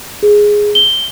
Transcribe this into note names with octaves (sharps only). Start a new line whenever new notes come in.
G#4
G7